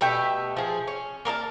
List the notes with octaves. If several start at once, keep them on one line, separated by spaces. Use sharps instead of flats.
B2 A3 G4 E5
F3 G#4
C#4
A#3 A#4 D#5 A5